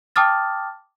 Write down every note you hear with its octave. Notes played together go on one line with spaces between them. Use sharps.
G5 A5 D6 D#6 F6 A6